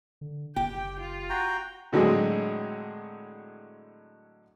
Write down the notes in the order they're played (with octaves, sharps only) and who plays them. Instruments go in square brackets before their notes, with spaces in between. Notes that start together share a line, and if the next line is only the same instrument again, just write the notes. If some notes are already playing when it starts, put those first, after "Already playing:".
[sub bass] D3
[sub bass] F#1 [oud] G4 [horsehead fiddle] G5
[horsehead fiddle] F4
[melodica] F#4 G5 A#5
[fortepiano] A2 D3 F#3 G#3 C4 G#4